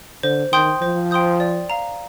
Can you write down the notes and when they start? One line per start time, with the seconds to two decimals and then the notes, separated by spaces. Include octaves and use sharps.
0.23 D3 C5
0.52 D#3 G5 C6 D#6 G6
0.81 F3 C5
1.11 G5 C6 D#6 G6
1.40 D5
1.70 F5 A#5